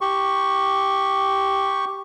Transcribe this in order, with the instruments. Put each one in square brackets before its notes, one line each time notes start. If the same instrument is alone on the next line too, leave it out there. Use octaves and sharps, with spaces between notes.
[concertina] G4 C#6